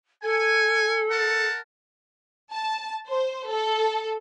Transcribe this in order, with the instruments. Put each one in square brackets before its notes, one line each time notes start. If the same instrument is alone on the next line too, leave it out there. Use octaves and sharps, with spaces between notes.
[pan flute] A4 [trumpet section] G#5
[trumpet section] A#4 F#5 A5
[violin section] A5
C5
A4